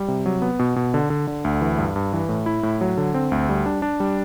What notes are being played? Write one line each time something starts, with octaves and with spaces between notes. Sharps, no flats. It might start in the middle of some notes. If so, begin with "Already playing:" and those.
Already playing: G3
C3
F#3
B3
B2
B2
D3
D3
D3
D2
E3
G2
G2
E3
A2
E4
A2
F#3
D3
C4
D2
G3
D4
D4
G3